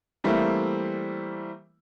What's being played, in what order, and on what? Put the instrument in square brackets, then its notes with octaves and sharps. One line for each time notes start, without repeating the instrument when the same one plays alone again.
[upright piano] E3 G3 A3 A#3 C4 E4